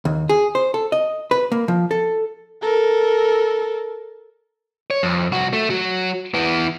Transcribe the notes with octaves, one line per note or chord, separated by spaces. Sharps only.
D#2
G#4
C5
A4
D#5
B4
A#3
F3
A4
A4 A#4
C#5
F2
C2 F#4
A3
F#3 F#4
E3 B3